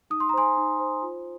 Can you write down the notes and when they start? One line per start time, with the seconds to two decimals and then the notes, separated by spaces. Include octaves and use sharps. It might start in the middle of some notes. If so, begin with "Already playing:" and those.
0.10 D#4 D#6
0.20 C6
0.29 A#5
0.34 C5 G#5 C6
0.57 D#4
0.80 C5
1.02 F4